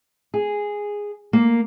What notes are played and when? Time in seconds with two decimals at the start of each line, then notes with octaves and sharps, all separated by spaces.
0.34 G#4
1.33 A#3